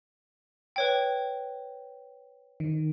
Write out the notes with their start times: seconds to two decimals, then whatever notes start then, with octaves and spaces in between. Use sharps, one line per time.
0.76 B4 C#5 G5
2.60 D#3